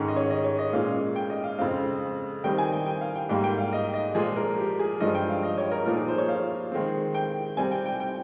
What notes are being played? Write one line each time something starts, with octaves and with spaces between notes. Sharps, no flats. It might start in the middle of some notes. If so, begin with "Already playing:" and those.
Already playing: G#2 D#3 G#3 C#4
D#5
C#5
D#5
C#5
D#5
A#2 G#3 C#4 F5
G5
D#5
F5
F2 C#3 G#3 C4 F5
D#3 G3 C4 D#4 G5
G#5
G5
G5
F5
G5
G#2 G3 A#3 G5
G5
F5
D#5
D#5
A#2 F3 G#3 G#4
A#4
G4
G#4
G2 F3 G#3 D#5
G5
F5
D#5
C#5
A#4
A#2 F3 A#3 D#4 A#4
G#4
C5
C#5
F5
D#3 G#3 C4
G5
C3 G3 C4 G#5
G5
G5
G5